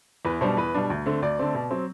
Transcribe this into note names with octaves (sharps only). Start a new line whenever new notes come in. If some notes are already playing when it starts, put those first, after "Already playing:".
E2 B4
B2 G3 D4 C5
E2 B4
B2 G3 D4
D2
D3 A3 C4
D2 D5
D3 A3 C4
B2
F#3 C4